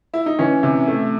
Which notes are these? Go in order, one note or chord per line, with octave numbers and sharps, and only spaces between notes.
E4
D#4
E3 C#4
C3
A3